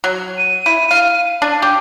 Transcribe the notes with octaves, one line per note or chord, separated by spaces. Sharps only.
F#3
D#7
E4
F5
D4
G4